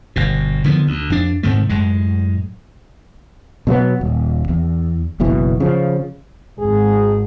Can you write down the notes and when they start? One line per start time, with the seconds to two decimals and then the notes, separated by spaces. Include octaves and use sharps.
0.16 G1 B2
0.64 D3 E3 F3 B3
0.87 D2
1.10 F2 D4
1.43 G#2 C3 D#3 A3
1.69 F#2 A2 G#3
3.67 B2 F#3 A3 B3
4.01 D#1
4.49 E2
5.20 F#1 B1 B2 E3
5.60 C#3 F3
6.59 G#1 G#4